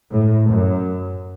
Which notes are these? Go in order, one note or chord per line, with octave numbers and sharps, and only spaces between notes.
A2
F#2